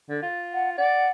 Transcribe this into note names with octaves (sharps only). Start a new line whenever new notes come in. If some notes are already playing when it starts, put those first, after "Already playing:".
D3
F4
F#5
D5 F#5